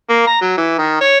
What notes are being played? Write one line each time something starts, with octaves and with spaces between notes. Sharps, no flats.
A#3
A#5
F#3
E3
D#3
C#5